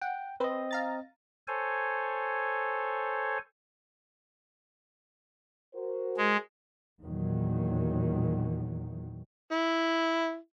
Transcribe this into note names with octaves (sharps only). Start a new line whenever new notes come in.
F#5 G5
C4 B4 C5 D#5
F5 A#5 A6
A4 C5 C#5 G#5
F#4 A#4 C5
G#3
E2 A#2 D#3 F#3
E4